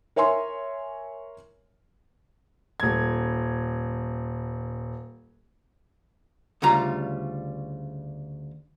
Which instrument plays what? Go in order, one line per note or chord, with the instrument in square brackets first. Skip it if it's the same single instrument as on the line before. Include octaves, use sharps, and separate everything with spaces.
[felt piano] A#4 C#5 E5 G#5 C6
[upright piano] D#1 G#6
[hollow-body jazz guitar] D2 C#3 G3 F4 A#5